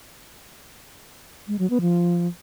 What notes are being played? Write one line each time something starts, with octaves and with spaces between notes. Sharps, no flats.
G#3
F#3
B3
F3